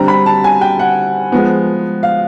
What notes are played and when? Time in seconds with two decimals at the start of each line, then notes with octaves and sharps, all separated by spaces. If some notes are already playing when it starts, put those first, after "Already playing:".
Already playing: D3 G3 C4 A#5
0.08 B5
0.26 A5
0.44 G#5
0.61 G5
0.79 F#5
1.32 F3 G#3 B3
2.03 F5